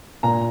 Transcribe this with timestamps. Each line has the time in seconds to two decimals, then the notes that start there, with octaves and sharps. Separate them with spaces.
0.23 A#2 A#5